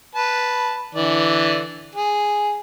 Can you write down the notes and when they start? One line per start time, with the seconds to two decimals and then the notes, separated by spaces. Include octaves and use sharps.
0.15 B4 A5
0.95 D3 E3 D5
1.95 G#4